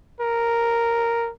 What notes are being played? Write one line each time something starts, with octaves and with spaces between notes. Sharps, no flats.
A#4